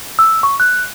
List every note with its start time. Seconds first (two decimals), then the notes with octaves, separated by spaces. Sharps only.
0.19 E6
0.43 C#6
0.60 F#6